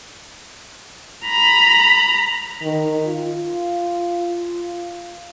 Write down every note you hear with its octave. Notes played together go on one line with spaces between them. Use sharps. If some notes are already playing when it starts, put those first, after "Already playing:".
A#5 B5
D#3
F4